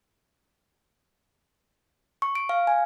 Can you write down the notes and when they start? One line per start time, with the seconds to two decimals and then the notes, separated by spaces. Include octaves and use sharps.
2.22 C#6
2.35 D7
2.49 F5
2.67 G#5